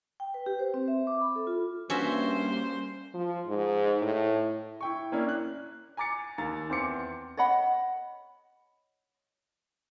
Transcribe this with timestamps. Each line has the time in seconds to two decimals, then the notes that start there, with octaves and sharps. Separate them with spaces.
0.20 G5
0.34 B4
0.46 G4
0.59 C5
0.74 C4
0.88 E5
1.07 D6
1.21 B5
1.36 A4
1.47 F4
1.90 G2 G3 A#3 C#4 F#4 C5 E5
3.14 F3
3.46 G#2
4.01 A2
4.81 E4 G5 C#6
5.12 A#3 C#4 D4 E4
5.29 F#6
5.97 G#5 A#5 D6 A6 C#7
6.38 D#2 A#5 A6
6.69 E2 C4 C5 D6 C#7
7.37 C#5 D#5 F#5 B5